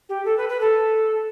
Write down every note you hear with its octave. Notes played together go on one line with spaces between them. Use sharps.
G4
A4
B4
B4
A4